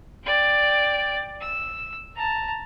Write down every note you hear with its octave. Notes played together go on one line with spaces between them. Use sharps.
D5 G5
E6
A5 A#5